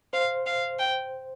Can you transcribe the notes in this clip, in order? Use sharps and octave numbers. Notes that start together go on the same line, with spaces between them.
C5 F5
F5
G5